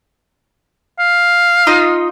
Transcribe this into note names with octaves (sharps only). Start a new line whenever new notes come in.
F5
D#4 F4 D#5